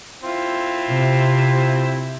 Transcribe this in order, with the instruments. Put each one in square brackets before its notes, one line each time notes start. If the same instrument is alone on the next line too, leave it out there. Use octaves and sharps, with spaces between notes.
[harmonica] C4 E4 F4
[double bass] C3